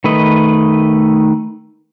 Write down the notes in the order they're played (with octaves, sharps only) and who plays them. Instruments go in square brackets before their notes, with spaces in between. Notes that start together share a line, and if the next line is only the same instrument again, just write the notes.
[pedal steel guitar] D#3 A3 B4 D#5